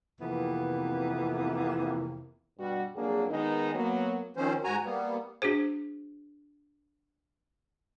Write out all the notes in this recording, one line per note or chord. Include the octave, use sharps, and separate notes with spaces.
F2 C3 E3 A#3 B3
G2 B2 G3 F#4
F2 F#3 A#3 D4 G#4
D#3 G#3 B3 D#4
F#3 A#3 B3
D#3 F3 C4 C#4 C5
G#2 F#4 G#5 A#5
G3 A#3 B3
D4 F#4 G#4 C5